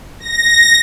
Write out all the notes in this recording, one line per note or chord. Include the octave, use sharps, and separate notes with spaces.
A#6